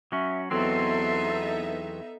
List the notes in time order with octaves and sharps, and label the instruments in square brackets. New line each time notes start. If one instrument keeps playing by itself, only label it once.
[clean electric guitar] F#3 C#4 [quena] E5
[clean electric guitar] E2 F#3 C4 [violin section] B3 D#4 E5 [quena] A4 [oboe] C6